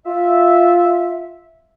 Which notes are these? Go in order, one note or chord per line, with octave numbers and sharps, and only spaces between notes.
F4 E5